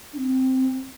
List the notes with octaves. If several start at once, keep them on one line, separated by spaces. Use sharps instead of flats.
D4
C4